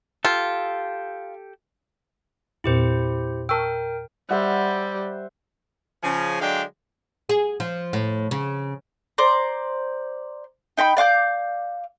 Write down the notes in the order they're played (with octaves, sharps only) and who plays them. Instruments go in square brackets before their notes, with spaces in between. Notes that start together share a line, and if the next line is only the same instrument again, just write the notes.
[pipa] F4 [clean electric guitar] G4 A4
[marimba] E2 A#2 C4 [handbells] E4 G4 C5
[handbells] A#4 G5 [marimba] A5 C#6 E6
[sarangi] G3 [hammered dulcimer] C5 E5 F#5
[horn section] C#3 F3 G#5
D3 F#3 G#3 D4 F5 G5
[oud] G#4
F3
A2
C#3
[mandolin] C5 D5 A#5
D#4 G5 A#5 B5
D5 F5 D6 G6